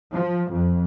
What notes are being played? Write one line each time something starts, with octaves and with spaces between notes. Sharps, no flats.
F3
F2